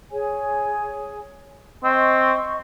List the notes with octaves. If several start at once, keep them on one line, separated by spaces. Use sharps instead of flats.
G#4 C#5 G#5
C4 D#5 C6 C#6